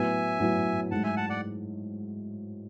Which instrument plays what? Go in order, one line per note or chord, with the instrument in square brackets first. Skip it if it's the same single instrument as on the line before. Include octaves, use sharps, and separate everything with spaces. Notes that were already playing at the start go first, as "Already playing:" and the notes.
Already playing: [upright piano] A2 F#3 B3 [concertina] E5 G#5
[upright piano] A2 F#3 B3
[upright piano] G#2 F#3 A3 [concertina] F#5 A5
[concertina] E5 G#5
F#5 A5
D5 F#5